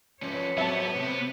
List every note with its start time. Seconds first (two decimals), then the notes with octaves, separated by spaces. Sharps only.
0.22 F3 C#4 B4 C#5
0.58 F#3 B3 C4 E5 A5
0.97 C3 C4